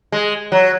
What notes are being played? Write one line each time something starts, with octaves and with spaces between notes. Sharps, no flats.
G#3
F#3